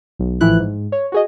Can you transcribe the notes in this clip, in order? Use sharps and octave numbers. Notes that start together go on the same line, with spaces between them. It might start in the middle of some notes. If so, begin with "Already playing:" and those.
B1
A1 A2 E3 F3 E4 F#6
G#2
C#5
F#4 G#4 D#5